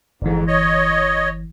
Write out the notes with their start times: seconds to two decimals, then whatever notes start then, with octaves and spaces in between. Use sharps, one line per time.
0.22 G1 F2 G#2 E3
0.47 C#5 D#5